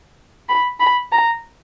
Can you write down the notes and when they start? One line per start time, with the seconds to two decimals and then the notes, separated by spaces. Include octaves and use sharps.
0.49 B5
0.80 B5
1.12 A#5